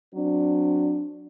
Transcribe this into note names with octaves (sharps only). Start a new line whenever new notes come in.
F#3 C4 D4